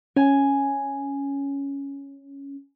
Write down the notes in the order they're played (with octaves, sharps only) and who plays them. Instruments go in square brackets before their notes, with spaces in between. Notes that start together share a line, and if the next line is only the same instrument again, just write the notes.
[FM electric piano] C#4 [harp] G#5